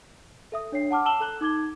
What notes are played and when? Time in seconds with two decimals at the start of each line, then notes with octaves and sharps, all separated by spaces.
0.52 A4 E5 D#6
0.72 D4 C#5 G5 C7
0.91 F#5 A5 D6 F6
1.05 A5 E6 E7 F#7 G7
1.20 A4 A#5 F#6 F#7 G7
1.41 D#4 D6 G#6 G7